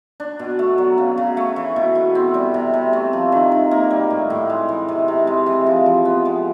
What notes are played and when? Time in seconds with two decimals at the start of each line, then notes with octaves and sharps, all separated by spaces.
0.20 D4
0.39 B2
0.59 A3
0.78 F#3
0.98 C#3
1.18 C#3
1.37 A3
1.56 E3
1.76 B2
1.95 B2
2.15 C4
2.34 G3
2.54 C3
2.74 C3
2.93 A3
3.13 F3
3.32 D#3
3.52 D#3
3.71 A#3
3.91 G3
4.10 A2
4.30 A2
4.50 G#3
4.68 E3
4.88 C3
5.08 C3
5.27 G#3
5.46 E3
5.67 F3
5.86 F3
6.05 B3
6.25 G#3